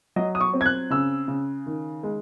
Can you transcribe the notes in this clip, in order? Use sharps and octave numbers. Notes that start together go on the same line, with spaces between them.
F#3 D#5
D#6
C#6
C4
G#6
F#6
C#3 E6
C#3
D#3
G#3